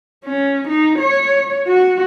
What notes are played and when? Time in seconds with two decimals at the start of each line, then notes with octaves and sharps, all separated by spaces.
0.25 C#4
0.68 D#4
0.99 C#5
1.68 F#4